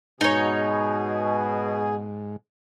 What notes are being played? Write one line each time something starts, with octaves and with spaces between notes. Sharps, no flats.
G#2 B2 D#4 G#4 C#5